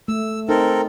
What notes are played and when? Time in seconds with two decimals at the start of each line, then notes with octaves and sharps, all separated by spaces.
0.08 A3 E6
0.49 C4 D#4 A4 A#4